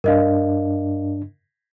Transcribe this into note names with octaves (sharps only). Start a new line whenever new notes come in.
G2 D4 A#4 D#5 F5